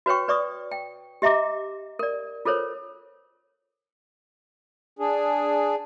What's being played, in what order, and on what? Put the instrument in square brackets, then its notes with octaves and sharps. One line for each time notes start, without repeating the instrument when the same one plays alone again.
[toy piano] F#4 B4 C#5 G5 C#6
B4 D5 C#6 D#6
G5
G4 D#5 E5 A#5 D6
A#4 D5
F4 A4 A#4 C5 C#5
[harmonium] D4 G#4